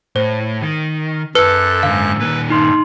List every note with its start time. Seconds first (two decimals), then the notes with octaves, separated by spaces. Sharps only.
0.16 A2 C5
0.61 D#3
1.35 F#2 A4 B4 E6 F#6
1.83 G#2 D3 F5
2.19 A#2 D#3 B4
2.50 G2 D#4 C6